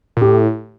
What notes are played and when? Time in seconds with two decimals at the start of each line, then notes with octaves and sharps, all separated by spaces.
0.17 A#2
0.21 A2 G4